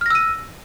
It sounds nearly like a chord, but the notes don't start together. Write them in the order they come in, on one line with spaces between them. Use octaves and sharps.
F6 A#6 E6 D#7